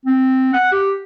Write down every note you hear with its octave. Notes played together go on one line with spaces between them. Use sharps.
C4
F#5
G4